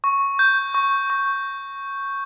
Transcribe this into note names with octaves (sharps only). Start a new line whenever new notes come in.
C#6
G6
C#6
C#6